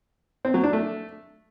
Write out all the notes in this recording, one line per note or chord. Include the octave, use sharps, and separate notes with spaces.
C4
F#3
D4
A3